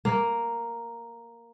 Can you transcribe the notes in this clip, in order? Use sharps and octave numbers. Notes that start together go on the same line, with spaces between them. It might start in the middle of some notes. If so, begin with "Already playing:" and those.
A#3